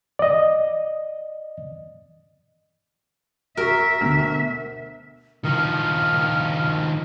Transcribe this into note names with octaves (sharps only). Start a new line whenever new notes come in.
D5 D#5
F#4 A#4 E5 C#6
D2 B2 F6
D#3 F3 F6